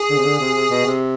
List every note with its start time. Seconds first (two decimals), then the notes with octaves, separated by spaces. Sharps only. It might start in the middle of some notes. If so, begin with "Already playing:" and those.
Already playing: G#4
0.10 D3
0.16 C3
0.24 D3
0.39 C3
0.54 C3
0.70 B2
0.85 C3